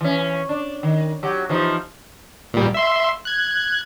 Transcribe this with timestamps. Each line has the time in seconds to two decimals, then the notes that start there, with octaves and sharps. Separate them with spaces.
0.01 E3 C#4
0.49 D4
0.83 D#3
1.23 F#3 G4
1.49 E3 F3 D#4
2.54 A#2 G3
2.74 E5 C6
3.25 F#6 G#6